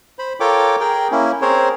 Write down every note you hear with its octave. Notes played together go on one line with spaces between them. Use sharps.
C5 B5
F4 A4 A#4 C#5 G5 D6
G#4 A#4 G5
A#3 C#4 E4
C4 G#4 A#4 C5 C#5